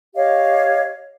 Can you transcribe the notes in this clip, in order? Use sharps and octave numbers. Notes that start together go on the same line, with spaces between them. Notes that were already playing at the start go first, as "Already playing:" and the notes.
G4 C#5 D#5 F5